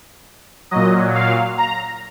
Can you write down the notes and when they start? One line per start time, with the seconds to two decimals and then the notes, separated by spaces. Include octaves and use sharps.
0.71 A#2 F#3 D#5
1.15 F5
1.58 A#5